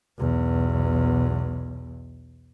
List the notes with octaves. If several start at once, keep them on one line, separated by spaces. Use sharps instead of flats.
B1 E2